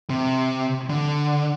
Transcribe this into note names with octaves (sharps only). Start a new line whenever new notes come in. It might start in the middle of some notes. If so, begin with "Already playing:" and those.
C3
D3